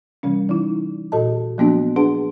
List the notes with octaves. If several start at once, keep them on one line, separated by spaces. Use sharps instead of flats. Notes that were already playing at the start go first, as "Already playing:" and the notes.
C3 E3 G3 C#4
E3 D#4 E4
A#2 F#4 A4 D#5 A5
F3 F#3 A#3 B3 D4 F#4
D4 G#4 B4 F#5 A5